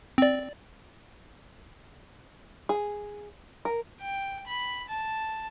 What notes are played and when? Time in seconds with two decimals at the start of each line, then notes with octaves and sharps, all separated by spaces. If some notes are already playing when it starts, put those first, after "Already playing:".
0.18 C4 D5
2.69 G#4
3.65 A#4
4.01 G5
4.47 B5
4.89 A5